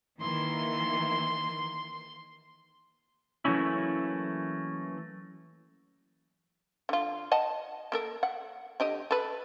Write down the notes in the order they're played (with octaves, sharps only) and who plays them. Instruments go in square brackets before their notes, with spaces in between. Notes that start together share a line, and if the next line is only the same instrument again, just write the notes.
[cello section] D#3 E3 A#3 [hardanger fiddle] C6
[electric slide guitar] E3 F#3 A3 A#3 C#4 E4
[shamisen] D3 F4
D#5 F#5 A5
A#3 A4 A#4
F#5
D3 G4 D#5
A4 B4